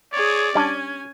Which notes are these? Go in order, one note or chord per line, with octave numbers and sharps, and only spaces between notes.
G#4 C#5 D5
G3 C#4 D4 G#5